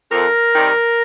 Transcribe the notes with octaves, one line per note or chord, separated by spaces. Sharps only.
F2 A#4
C3 D#3 G3